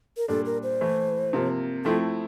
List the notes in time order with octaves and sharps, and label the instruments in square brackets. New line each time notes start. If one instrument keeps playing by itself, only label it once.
[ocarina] A#4
[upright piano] A#2 G3 D4 [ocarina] A4
[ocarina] A#4
C5
[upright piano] E3 A3 E4
C3 F3 A#3
[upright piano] F3 A3 C4 E4 [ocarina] A4